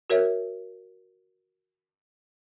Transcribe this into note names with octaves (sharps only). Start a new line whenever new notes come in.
F#4 A#4 C#5 E5